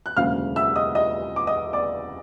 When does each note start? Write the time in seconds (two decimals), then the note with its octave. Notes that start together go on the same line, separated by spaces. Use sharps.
0.06 F#6
0.17 E1 D2 C#3 F#3 A#3 F5 F6
0.56 E5 E6
0.76 D#5 D#6
0.95 D#5 D#6
1.36 D6
1.47 D#5 D#6
1.73 D5 D6